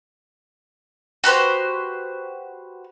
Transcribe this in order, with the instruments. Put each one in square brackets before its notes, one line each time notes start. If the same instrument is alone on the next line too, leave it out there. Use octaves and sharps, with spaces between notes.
[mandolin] F#4 G4 B4 C5